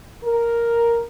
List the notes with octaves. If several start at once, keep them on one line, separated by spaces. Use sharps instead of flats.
A#4